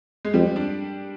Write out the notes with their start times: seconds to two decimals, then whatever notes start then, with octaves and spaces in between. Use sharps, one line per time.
0.25 G#3
0.34 F2 G3
0.56 D4